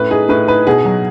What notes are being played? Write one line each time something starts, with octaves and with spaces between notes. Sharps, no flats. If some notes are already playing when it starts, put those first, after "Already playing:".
Already playing: A2 C#4 B4
D#4 G#4
A2 B4
D#4 B4
B2 G#4
F#3